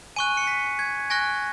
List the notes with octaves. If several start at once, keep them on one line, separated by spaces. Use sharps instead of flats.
G#5 C#6 F#6 D#7
C#7
B6
G#6
G#5 C#6 F#6 A#6